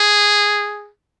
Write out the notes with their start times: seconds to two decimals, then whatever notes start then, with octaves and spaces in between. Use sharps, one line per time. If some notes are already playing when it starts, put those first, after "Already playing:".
Already playing: G#4